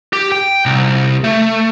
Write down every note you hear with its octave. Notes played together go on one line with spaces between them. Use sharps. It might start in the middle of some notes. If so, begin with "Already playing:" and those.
G4
G5
C2
A3